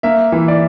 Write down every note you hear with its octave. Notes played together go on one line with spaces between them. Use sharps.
A#3 E5
E3
D5